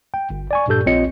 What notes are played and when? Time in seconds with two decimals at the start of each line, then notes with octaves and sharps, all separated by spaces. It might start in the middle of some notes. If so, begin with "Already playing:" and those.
0.14 G5
0.30 G1
0.51 D5 G#5 C#6
0.68 G2 A#2 G4 A4 G6
0.86 A#1 C4 F4 C#5 D#5 C#7